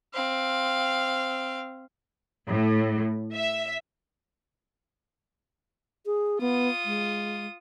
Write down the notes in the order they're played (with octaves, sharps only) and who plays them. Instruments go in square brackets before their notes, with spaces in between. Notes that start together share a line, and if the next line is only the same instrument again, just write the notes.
[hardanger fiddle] C4 F5
[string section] A2
E5
[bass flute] G#4
[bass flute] B3 [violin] F4 D#6
[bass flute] G#3